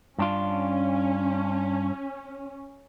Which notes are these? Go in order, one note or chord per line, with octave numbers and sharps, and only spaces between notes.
G2 C#4 D4 F4